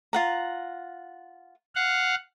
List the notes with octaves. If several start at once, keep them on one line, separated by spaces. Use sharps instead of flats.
F4 F#5 A#5
F5 F#5